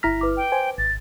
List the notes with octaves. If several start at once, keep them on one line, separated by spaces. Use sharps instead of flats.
G1 E4 A#5 F6 A#6 B6
B4 D6
G5
C5 G#5
G#1 A6